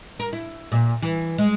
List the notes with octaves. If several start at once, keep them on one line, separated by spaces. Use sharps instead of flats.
A#4
E4
A#2
E3
G#3